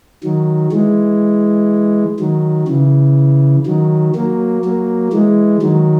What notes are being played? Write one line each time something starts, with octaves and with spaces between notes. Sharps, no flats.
D#3 F#3
E3 G#3
D#3 F#3
C#3 E3
D#3 F#3
F#3 A#3
F#3 A#3
E3 G#3
D#3 F#3